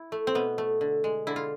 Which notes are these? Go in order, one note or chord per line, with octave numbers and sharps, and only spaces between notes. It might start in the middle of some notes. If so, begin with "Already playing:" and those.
Already playing: E4
A3
C4
B2 B3
A3
D3
G#3
D3 E4
F4